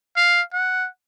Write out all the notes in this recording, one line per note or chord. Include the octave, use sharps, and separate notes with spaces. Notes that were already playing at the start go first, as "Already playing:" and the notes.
F5
F#5